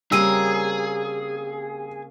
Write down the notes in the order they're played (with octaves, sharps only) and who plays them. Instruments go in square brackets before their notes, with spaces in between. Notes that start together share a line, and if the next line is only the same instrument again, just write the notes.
[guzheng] C#3 A#3 C4 [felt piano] G3 [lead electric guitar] G#4 [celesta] E6 D#7